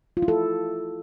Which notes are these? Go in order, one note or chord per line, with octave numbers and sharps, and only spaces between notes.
F4
E4
A4